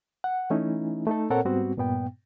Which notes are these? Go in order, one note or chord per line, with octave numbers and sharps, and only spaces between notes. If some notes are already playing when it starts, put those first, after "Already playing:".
F#5
E3 A3 C#4 D#4 E4
A3 D#4 A4
A#2 C4 A4 A#4 C#5 F#5
G#2 G3 B3 C4 F#4
G2 A#2 B3 G5